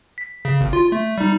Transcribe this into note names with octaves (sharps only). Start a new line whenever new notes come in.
B6
C#3
G#1
F4
A3
G3 D#4